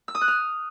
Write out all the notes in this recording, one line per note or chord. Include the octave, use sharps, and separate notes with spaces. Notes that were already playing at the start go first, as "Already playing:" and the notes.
E6
D#6
F#6
F6